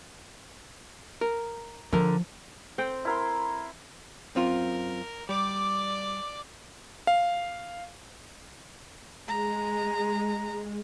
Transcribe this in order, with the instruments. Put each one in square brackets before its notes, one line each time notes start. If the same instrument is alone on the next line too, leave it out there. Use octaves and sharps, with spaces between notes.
[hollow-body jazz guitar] A#4
[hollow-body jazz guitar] D3 A#4 [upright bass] F3
[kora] C4 A4 G5
[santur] E4 A#4 C6
[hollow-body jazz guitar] F#2 C4 F4 [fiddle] A#4
[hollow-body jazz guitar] G3 [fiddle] D5 D6
[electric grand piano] F5
[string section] G#3 [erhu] A#5